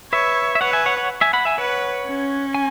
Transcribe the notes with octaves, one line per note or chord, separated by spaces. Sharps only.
B4 C#5 E5
E5
B4 C#5 F#5
E5 G#5
C#5 F#5
C#5 F#5
E5 G#5
F#5 B5
E5 G#5
B4 C#5 F#5
C#4
G#5